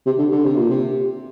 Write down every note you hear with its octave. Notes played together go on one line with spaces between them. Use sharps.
C3
D3
D3
C3
A#2
C3